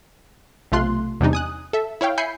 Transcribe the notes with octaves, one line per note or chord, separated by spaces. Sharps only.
B1 C3 A3 F4 C6 F#6
E2 C3 G3 D4 D#4
G#5 D#6 F#6
A4 E5
E4 C#5 F5 G5
E5 G#5 B5 G6 C7 C#7